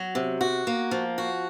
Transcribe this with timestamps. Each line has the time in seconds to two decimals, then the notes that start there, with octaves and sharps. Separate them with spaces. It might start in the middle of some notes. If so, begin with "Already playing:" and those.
Already playing: F#3
0.15 C3
0.41 F#4
0.67 A#3
0.91 F3
1.18 F#4